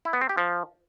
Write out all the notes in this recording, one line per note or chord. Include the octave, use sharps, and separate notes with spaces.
E4
B3
C4
G4
F3